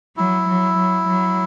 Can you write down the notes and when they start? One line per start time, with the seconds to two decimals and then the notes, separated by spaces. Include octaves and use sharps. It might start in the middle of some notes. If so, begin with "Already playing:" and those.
0.17 F#3 E4
0.48 F#3
0.77 F#3
1.07 F#3